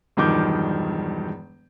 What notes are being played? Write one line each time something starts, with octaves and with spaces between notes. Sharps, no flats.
E1 G2 D#3 F3 D6 G6